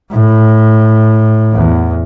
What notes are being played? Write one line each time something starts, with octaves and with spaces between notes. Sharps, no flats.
A2
E2